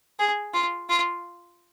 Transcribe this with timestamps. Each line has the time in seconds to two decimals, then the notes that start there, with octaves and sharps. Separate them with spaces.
0.19 G#4
0.54 F4
0.90 F4